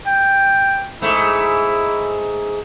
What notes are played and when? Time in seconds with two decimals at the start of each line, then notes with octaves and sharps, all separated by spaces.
0.06 G5
1.02 G#2 A3 E4